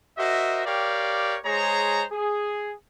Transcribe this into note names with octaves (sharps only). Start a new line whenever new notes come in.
F#4 A#4 C5 D#5 E5
G4 A#4 C#5 D5 F5 G5
G#3 G#4 C5 C#5 A#5
G#4